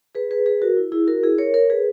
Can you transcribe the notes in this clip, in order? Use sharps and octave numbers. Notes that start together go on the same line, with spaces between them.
G#4 B4
G#4 B4
G#4 B4
F#4 A#4
E4
E4 G#4
F#4 A#4
E4 G#4
A#4 C#5
A#4 C#5
G#4 B4